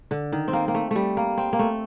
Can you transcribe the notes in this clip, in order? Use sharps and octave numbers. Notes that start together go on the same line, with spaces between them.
D3
D#3
C4
A#3
A#3
A3
G3 A3
A#3
C4
A#3
A3